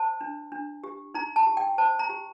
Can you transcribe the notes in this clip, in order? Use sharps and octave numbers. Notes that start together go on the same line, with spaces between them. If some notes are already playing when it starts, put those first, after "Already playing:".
Already playing: C5 A5
D4
D4
G4
D#4 A#5
A5
G4
G5
C5 A5
A#5
G4